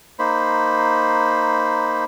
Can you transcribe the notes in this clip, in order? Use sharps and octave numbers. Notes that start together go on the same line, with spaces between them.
A#3 D#4 C5 B5